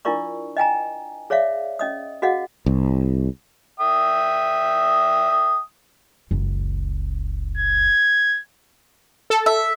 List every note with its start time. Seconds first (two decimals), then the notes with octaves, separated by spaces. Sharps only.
0.05 D4 E4 F4 A#4 D5 C#6
0.57 D#5 G5 G#5 A#5
1.30 G#4 C#5 D5 E5 F5
1.79 C#4 D#5 D#6
2.22 F#4 G#4 D#5 F5 F#5
2.66 C2
3.80 E5 G5 D#6
6.31 F#1 C#2
7.58 G#6
9.30 A4
9.46 E5